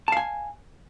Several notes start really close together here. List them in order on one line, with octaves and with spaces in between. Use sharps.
A5 F5 G#5